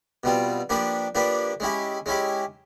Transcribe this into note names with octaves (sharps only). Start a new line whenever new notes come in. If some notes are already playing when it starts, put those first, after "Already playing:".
B2 G3 C4 F4
F3 A#3 D4 G4 B4
F3 A#3 D4 G4 B4
G#3 C#4 E4 G4
G#3 C#4 E4 G4